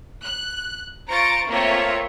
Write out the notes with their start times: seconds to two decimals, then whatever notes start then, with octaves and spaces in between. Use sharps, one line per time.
0.23 F#6
1.08 F4 C5 A#5 C#6 A6 D7
1.48 A3 A#3 C4 F4 C#5 E5